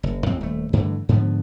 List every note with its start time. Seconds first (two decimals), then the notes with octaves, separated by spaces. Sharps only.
0.03 F#1
0.26 A1 F2 C4
0.41 D#1 A3
0.73 G2 D3 E3 A3
1.09 G#2 D3 F3 B3